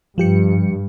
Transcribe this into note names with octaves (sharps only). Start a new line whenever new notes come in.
G2 F3 G4 C#7